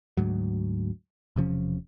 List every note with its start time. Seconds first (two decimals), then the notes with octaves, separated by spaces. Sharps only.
0.17 D2 G#2 F#3
1.36 E1 C3 F3 C#4